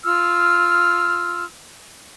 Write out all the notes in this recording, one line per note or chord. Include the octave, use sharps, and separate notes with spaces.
F4 E6 F6